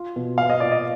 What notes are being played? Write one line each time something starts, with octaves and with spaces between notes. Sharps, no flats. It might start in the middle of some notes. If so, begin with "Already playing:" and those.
Already playing: F4
B2
B3 F5
D#5
A#2 D5
D#5